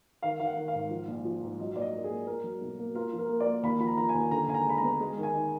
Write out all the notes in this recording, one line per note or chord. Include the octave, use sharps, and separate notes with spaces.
D#3 F5
D#3 F5
F#5
D#3
F5
G#2
F3
A#1
F3
G#2
F#3 D#5
A#2 D5
D#5
A#3
G#4
A#3
A#3 A#4
F#3
B1
A#3
F4 A#4
F3
A#4
A#3
D5
A#3
D#2 B5
F3 B5
A#5
F3 A#5
G#5
D#2
D3 A#5
D#2 G#5
A#5
G#3 B5
A#5
B3
G#3
D#3
G#5
D#4